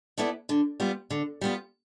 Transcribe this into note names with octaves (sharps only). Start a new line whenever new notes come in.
B3 E4 A4 D5
D3
G3 B3 F4
D3
G3 B3 F4